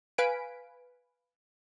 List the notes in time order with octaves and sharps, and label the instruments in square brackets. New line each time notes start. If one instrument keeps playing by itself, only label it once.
[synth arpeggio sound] B4 F5 G#5 B6 D7